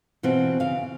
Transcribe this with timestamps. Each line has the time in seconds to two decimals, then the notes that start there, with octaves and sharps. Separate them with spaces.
0.23 B2 E3 C4 F4 F#4
0.60 C#3 F5